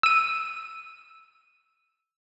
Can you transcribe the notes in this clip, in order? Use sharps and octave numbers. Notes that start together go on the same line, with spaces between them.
E6 D#7